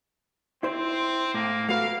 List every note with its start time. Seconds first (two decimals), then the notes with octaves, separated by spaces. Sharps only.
0.63 C4 E4 C5
1.34 A2 A#3
1.69 A3 F#4 B4 F5